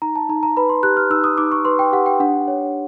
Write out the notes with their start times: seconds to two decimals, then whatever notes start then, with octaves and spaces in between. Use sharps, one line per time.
0.02 D#4 A#5
0.16 A5
0.29 D#4 A#5
0.43 A#5
0.57 B4 B5
0.69 C6
0.83 G4 F#6
0.97 F6
1.10 D#4 E6
1.24 D#6
1.38 D#4 D6
1.52 C#6
1.65 B4 C6
1.79 G5
1.92 G4 F#5
2.06 G5
2.20 D4 F#5
2.48 C#5